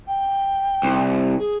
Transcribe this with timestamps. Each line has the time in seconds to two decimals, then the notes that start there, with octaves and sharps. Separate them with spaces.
0.08 G5
0.83 C2
1.39 G#4